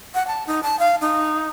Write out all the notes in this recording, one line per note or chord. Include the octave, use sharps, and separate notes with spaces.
F#5
A5
D#4
A5
F5
D#4